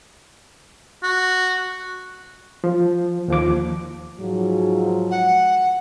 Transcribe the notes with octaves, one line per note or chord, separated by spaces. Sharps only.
F#4
F3
D#2 F3 D6
G#2 F3 F#3
F#5